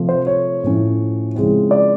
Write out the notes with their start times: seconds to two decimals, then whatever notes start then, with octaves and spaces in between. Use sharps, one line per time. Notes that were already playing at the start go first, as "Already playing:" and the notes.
Already playing: C3 F3 A3
0.09 C5
0.27 C#5
0.64 A2 F3 A3 C#4 E4
1.35 C#3 F3 G#3 C4 E4
1.71 D5